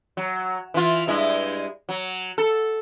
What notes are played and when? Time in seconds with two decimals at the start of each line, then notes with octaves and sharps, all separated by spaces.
0.17 F#3
0.74 E3 F4
1.07 G2 G#3 E4
1.89 F#3
2.38 A4